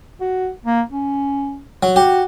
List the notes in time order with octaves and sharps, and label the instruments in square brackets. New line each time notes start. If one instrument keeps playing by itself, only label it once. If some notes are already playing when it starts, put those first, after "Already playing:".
[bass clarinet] F#4
A#3
C#4
[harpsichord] F#3
[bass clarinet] F#4 [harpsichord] G4